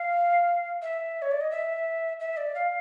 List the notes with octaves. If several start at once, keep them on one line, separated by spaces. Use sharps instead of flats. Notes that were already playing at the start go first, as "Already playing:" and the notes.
Already playing: F5
E5
C#5
D5
D#5
E5
E5
D5
F5